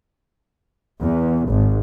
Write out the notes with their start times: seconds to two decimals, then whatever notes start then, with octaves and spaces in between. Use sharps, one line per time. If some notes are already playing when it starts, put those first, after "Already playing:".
1.02 E2
1.49 G#1